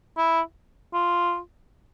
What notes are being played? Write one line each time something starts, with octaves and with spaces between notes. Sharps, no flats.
E4
F4